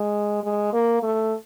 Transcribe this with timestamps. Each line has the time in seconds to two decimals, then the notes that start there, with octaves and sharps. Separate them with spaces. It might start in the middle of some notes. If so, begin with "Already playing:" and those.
Already playing: G#3
0.44 G#3
0.73 A#3
1.03 A3